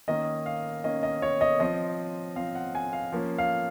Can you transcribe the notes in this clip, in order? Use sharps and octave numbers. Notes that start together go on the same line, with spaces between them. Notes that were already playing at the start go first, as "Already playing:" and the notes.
D#3 A#3 C#4 D#5
F5
D#3 A#3 C#4 D#5
D#5
C#5
D#5
F3 C4 D#5
F3 C4 F5
F#5
G#5
F5
F3 A#3 C#4
F5